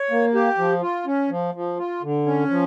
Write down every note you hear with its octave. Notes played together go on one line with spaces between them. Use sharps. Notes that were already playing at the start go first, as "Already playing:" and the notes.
Already playing: C#5
A#3
G4
F3
F4
C#4
F3
F3
F4
D3
C#4
F3